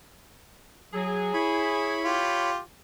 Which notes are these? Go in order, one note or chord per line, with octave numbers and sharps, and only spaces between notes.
F#3 G#4
E4 C#5 B5
F4 G4